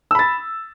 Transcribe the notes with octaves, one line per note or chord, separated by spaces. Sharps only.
B5 E6 A6